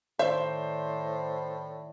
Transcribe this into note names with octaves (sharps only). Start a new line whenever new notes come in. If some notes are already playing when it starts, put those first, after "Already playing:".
A2 D#3 C5 D5 E5